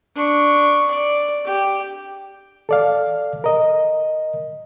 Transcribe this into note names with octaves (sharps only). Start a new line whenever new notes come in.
D4 C#6
D5
G4
A4 D5 F5
A#4 D#5